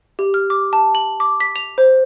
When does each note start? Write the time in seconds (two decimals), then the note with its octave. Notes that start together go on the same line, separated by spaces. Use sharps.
0.19 G4
0.34 F6
0.50 D6
0.73 A5
0.95 F#7
1.20 D6
1.40 B6
1.56 F7
1.78 C5